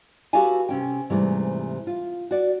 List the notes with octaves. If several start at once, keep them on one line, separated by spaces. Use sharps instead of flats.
F#4 G4 A4 B4 F5 G#5
C3 C#4 G5
G#2 C3 E3 G3 A3
F4
F#4 D5